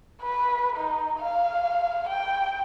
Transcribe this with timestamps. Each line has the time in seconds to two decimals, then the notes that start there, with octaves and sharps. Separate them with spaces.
0.23 B4
0.76 D#4
1.19 F5
2.09 G5